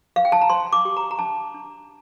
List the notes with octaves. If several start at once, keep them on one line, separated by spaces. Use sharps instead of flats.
F5
G5
A5
A#5
C5 C6
D6
G4
A#5
A#5
D4 A5
D4